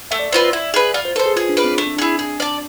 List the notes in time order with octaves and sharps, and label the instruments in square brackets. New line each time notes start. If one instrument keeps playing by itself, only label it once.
[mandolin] A3 [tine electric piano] E5
[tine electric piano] D5
E5
[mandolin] C4 F4 B4
E4
G#4 B4
[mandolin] F4 [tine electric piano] D5
[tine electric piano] C5
[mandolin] A4 C5 [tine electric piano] B4
[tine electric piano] G#4
[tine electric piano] F4 [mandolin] G#4
[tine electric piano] D4
[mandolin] B4 D5 F5
[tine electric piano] C4
[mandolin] A3 [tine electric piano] D4
[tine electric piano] C4
[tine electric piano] D4 [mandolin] E4 G#4
[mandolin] G#4
D5 A5